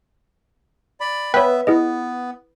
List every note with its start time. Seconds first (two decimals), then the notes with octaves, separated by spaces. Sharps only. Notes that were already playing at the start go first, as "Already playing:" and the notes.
1.00 D5 B5
1.34 B3 B4 C#5 E5 G5
1.67 B3 E4 G#4 D#5